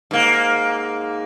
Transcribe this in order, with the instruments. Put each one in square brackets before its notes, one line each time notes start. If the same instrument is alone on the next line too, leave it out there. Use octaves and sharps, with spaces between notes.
[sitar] G#2 A#3